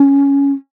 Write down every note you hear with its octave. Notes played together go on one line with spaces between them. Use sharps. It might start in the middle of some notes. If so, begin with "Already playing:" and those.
Already playing: C#4